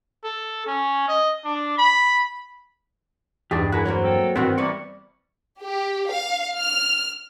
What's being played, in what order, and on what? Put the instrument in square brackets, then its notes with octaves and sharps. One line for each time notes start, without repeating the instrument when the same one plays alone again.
[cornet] A4
C#4
D#5
D4
B5
[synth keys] E2 G2 [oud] D4 D#4 [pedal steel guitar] G4 G#4 D5
[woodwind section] E4 [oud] F#4 A#4 [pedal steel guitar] G#4 B4 F#5
[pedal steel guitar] F#3 [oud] A#3 C4 C#5
[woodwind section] A4 G5
[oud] G2 B2 E3 [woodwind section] D#3 [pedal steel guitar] B3 F#4 F#5 [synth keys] C4
[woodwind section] C3 G3 A#3 [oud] E3 B3 [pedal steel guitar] C#6
[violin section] G4
F5
F6